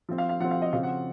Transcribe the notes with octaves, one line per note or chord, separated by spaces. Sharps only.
F3 C4
F5
F5
F3 C4 F#5
F5
D#5
C#3 F3 C4 F5
F#5